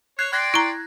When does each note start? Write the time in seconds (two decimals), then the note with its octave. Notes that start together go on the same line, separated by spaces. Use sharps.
0.19 C#5 F#6 G#6 C7
0.33 D5 G5 C6 F#6 G#6 A#6
0.54 E4 A#5